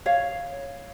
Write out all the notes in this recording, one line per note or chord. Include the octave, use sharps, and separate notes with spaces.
C#5 F5